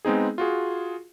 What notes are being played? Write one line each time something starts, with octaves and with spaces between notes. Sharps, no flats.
G#3 B3 C4 D#4 G#4
F4 F#4 G#4